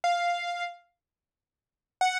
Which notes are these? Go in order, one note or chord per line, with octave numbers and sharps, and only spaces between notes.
F5
F#5